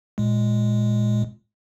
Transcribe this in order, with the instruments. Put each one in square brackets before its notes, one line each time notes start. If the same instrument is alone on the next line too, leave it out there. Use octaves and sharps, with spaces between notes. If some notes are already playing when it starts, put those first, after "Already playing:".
[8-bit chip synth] A#2 G#3